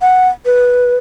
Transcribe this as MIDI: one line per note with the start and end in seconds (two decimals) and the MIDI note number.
0.02 0.29 78
0.45 0.96 71